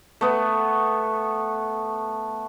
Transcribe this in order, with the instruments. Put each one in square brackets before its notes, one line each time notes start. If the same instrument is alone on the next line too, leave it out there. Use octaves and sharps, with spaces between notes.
[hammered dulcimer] A3 B3